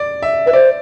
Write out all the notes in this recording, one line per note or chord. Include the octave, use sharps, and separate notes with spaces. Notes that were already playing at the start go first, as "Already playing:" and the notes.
Already playing: D5
E5
B4 E5
C5 D5